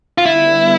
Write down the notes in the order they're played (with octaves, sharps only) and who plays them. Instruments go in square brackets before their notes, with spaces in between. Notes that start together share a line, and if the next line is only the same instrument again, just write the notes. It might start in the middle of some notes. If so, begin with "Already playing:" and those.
[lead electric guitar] F4
[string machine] D3 G3 B3 [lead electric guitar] E4